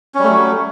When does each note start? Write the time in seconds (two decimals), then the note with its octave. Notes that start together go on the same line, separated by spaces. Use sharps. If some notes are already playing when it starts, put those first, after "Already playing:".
0.15 C#4
0.19 G3
0.24 A3
0.28 F#3